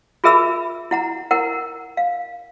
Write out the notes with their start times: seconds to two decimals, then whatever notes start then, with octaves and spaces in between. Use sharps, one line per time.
0.24 F4 G#4 A#4 E5 B5 E6
0.91 E4 F#5 A#5
1.31 E4 A#4 F#5
1.97 F5